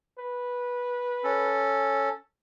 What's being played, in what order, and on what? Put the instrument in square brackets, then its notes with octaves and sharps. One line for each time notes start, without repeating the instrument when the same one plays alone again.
[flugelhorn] B4
[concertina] C#4 A4